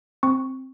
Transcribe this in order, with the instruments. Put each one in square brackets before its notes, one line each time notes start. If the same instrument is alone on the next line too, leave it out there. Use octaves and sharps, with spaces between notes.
[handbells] C4 C#6